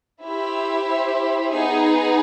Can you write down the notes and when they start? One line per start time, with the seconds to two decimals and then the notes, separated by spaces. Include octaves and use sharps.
0.23 E4 G4 C5 E5
1.52 B3 D#4 G#4